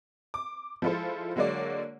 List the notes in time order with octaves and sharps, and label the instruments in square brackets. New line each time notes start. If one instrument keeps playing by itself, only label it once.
[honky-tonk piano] D6
F3 G#3 E4 F4 A4 C5
D3 F#3 G#3 A#3 C#5 D5